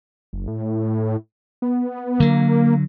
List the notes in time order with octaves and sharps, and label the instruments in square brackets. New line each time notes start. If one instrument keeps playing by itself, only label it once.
[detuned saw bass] F#1
A2
B3
[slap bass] D3 F#3 [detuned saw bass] A#3